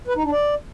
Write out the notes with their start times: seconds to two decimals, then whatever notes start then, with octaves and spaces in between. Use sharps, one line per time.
0.08 B4
0.16 D#4
0.23 D4
0.31 D5